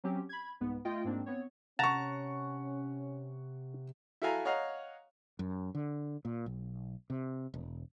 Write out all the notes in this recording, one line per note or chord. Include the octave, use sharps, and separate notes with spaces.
F#3 C4 C#4 G4
B5 G#6
C2 G#2 B3
A3 F4 D#5 G5
G#2 A#3 C4 D4
B3 C4 C#5
C3 C#4 F#5 A5 A#5 C#6
E4 F#4 A4 F5 G#5 A#5
C#5 D#5 F5 F#5 A#5
F#2
D3
A#2
B1
C3
E1